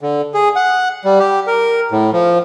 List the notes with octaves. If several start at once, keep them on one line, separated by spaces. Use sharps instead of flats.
D3
G#4
F#5
G3
G4
A#4
A2
F3